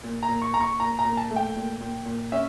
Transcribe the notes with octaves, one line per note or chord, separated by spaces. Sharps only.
A#2
A#5
A#2
C#6
A#2 A#5
C#6
A#2 A#5
A#5
A#2
A5
A3
G5
A#2
A#2
A#2
C#4 E5